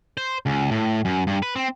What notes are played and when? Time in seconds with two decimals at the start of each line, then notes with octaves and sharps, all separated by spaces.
0.17 C5
0.46 C#2
0.71 A2
1.05 F#2
1.27 G2
1.42 B4
1.56 C4